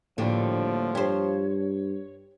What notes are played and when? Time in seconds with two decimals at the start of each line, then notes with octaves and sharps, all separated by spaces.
0.18 A#1 A2 D3 F3 G3 A#3 G5
0.95 G2 G4 C5 C#5